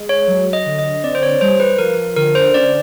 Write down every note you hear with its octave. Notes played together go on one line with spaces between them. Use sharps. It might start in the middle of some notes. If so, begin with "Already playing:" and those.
Already playing: G#3
C#5
F#3
D#5
D3
D#5
C4 D5
C5
C#5
G3 C5
B4
F3 A#4
D3 A#4
C5
C#4 D5